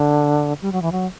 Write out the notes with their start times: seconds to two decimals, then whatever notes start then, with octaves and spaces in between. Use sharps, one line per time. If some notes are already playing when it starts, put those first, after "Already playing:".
Already playing: D3
0.62 G3
0.72 F#3
0.82 E3
0.92 F#3